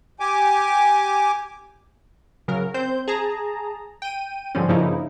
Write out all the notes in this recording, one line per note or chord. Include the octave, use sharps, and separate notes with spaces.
G4 G#5 D6
C#3 F#3 A#4
C4 C5 G6
G#4 A5 A#5
G5 D#7
G#2 D3 F3 G3 C4 C#4
G2 C#3 F3 A#3 D#4 E4